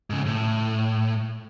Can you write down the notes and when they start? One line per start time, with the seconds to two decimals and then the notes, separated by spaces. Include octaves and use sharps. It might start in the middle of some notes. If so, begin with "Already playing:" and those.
0.10 G#2 C#3
0.27 A2